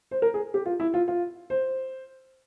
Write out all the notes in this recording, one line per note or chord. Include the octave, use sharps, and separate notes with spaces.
C5
A#4
G#4
G4
F4
E4
F4
F4
C5